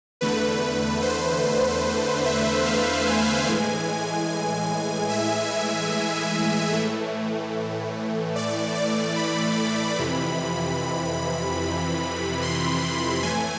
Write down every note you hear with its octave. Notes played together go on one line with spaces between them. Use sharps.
E2 D3 A3 B4
C5
E5
F5
G#5
A2 E3 G#3
E5
A2 E3 A3
D5
D5
B5
F2 C3 E3
C6
A2 E3 A3 G#5